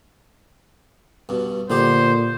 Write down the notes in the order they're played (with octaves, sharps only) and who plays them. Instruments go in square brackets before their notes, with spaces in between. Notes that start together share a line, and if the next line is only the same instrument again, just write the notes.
[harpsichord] G2 B2
[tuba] A#2 [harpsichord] D3 D#4 G4 [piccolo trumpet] C5